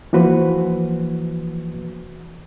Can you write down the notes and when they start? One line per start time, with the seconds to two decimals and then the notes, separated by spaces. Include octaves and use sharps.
0.13 E3 F3 A#3 F#4 B4 C5